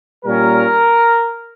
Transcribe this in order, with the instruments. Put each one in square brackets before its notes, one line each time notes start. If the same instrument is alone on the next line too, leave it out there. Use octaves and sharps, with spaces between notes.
[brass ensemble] A#2 G3 C#4 A#4